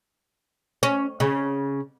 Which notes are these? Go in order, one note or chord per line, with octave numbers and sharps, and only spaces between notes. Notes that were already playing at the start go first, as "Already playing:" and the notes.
C#4
C#3